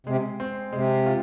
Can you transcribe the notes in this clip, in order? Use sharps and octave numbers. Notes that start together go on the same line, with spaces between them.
C3 G#3
C4
C3 G#3
F4